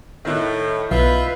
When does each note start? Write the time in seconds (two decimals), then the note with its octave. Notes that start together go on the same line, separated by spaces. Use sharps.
0.25 A2 D#3 E4 F#6
0.91 B1 F4 B4 E5